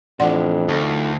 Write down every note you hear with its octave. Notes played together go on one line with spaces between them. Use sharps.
F2 A2 E3 D4 D5 F#5 C6
D2 D#4 F4 A4